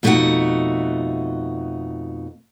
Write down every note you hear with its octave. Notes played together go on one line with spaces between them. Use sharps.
F2 B2 A3 D#4 F#4 F#5